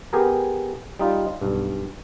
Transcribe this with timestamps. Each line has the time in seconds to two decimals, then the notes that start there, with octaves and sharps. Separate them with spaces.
0.13 B3 G4 G#4 A#4
0.99 G3 D#4 F4
1.42 B1 G2